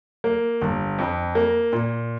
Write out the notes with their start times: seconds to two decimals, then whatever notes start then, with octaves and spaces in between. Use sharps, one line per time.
0.24 A#3
0.62 G1
0.98 F2
1.35 A#3
1.73 A#2